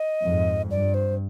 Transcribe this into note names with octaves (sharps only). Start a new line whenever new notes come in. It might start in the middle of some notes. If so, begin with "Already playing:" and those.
Already playing: D#5
F2 G#2
G2 D5
C5